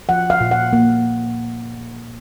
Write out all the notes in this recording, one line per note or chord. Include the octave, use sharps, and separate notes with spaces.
F3 F#5
F5
A#2
F#5
A#3